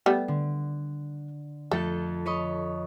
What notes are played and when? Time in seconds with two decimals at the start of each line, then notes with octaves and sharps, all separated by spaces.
0.06 G3 A3 B3
0.28 D3
1.71 F2 A3 A4 G6
2.26 B4 C#5 D#5